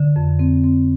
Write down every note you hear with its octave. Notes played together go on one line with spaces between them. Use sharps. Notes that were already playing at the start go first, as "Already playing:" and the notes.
Already playing: D3
F2
C4
C4